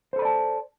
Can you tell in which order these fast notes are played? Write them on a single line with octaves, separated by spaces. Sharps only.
C5 A4 B5 D5 A5